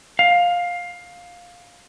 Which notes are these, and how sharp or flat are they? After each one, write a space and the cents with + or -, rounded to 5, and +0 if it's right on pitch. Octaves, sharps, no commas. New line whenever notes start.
F5 +15